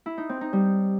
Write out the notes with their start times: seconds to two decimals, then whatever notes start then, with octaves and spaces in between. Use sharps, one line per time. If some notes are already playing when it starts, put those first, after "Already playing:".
0.06 E4
0.18 D#4
0.29 C4
0.41 D#4
0.53 G3